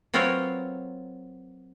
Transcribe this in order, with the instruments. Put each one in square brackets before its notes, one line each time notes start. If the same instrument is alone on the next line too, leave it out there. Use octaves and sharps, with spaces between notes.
[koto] F#3 C4 F4 A#4 B4 C#5